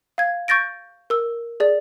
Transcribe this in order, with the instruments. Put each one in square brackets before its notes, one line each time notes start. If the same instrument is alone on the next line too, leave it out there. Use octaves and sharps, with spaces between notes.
[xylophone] F5 G#6
C#6 G6 A6 A#6 D7
A#4 E6
G#4 D5